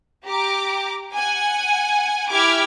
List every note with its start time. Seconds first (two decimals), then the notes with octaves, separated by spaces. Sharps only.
0.24 G4 A#5 D6
1.14 F#5 G#5
2.29 E4 G4 D6 F6 G#6 B6